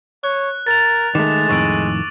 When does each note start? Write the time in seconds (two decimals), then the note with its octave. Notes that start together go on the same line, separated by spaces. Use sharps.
0.24 C#5 F#6
0.67 A#4 A6 F7
1.15 D#3 G#3 A3 D6
1.49 F2 A2 D#3 C#6 E6 D7